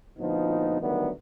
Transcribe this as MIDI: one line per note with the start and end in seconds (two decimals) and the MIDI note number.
0.18 0.79 38
0.18 0.79 46
0.18 0.79 53
0.18 0.79 59
0.18 0.79 63
0.80 1.10 50
0.80 1.10 51
0.80 1.10 54
0.80 1.10 55
0.80 1.10 57
0.80 1.10 59